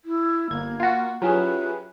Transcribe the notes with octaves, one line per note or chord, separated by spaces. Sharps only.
E4
G1 A#3 G#6
F4 F#4
F#3 C#4 E4 F4 G4 G#4 B4